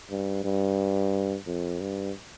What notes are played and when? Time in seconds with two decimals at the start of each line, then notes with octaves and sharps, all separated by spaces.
0.10 G2
0.44 G2
1.47 F2
1.81 G2